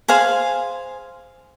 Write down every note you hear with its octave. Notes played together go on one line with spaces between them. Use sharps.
G#4 C5 F5 G#5